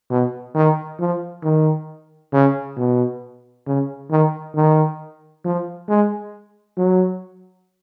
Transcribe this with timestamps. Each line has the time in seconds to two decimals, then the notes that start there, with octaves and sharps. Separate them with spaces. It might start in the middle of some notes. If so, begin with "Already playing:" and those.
0.10 B2
0.55 D#3
1.00 F3
1.44 D#3
2.33 C#3
2.77 B2
3.67 C#3
4.11 D#3
4.55 D#3
5.45 F3
5.89 G#3
6.78 F#3